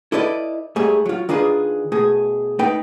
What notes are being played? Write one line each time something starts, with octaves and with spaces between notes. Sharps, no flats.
E4 A4 B4 D5 D#5
G#2 G3 A3 G#4
F#3 F4
D#3 D4 F4 G#4 B4
B2 A3 G#4
A3 D#4 B4 G5